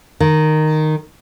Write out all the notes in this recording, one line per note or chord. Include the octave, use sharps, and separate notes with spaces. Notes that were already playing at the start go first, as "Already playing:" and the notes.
D#3